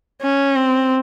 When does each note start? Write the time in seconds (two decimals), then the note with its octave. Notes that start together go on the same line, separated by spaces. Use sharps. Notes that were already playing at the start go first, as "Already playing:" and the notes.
0.22 C#4
0.56 C4